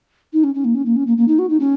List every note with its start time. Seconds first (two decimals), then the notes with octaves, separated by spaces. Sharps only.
0.33 D#4
0.43 C#4
0.54 C#4
0.64 A#3
0.74 C#4
0.85 A#3
0.96 C#4
1.07 A#3
1.17 A#3
1.27 D#4
1.38 F#4
1.49 D#4
1.59 C#4